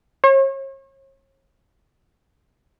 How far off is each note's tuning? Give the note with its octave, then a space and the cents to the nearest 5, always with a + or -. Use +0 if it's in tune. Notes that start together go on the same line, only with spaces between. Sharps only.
C#5 -40